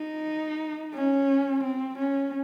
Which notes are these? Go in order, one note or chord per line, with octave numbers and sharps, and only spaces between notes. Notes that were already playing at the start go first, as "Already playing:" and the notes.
Already playing: D#4
C#4
C4
C#4